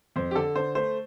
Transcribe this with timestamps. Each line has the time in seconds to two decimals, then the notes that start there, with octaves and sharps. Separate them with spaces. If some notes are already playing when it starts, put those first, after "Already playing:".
0.16 F2 C5
0.31 G4
0.35 D3 A4
0.56 D3 C5
0.75 A3 C5